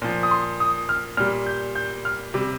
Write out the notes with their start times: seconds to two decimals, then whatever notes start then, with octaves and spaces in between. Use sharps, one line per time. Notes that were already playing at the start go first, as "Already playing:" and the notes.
0.02 A#2 F3
0.23 D#6
0.31 C6
0.60 D#6
0.89 F6
1.17 A#2 G3 F6
1.46 G6
1.75 G6
2.05 F6
2.34 C3 G3